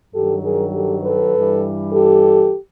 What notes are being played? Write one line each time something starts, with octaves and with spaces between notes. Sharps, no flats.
G2 D#3 F#3 G4 A4
G#4 A#4
G4 A4
A4 B4
G2 E3 G3
G4 A4